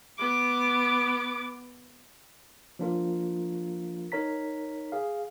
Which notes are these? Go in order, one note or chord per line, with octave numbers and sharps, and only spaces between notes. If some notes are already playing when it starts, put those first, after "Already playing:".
B3 D6
F3 A#3 D4 F4 A#4
D#4 A#4 C#5 A#5 B6
G#4 F5